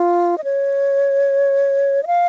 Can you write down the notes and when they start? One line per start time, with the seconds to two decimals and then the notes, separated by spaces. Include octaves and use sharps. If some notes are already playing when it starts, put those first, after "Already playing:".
Already playing: F4
0.38 D#5
0.44 C#5
2.03 D#5
2.07 F5